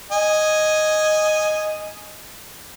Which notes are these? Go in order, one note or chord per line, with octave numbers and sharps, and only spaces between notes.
D#5 G#5